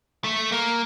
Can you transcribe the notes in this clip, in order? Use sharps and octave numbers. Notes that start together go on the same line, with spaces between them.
A3
A#3